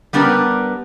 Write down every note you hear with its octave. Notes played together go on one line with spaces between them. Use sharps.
G3 B3 D4 G4 A#4 B4